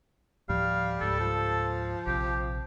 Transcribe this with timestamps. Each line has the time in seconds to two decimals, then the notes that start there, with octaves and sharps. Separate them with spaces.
0.49 D2 A2 F3 G3 F5
1.01 C#2 G#2 A4
1.20 F3
2.07 A#1 C3 G4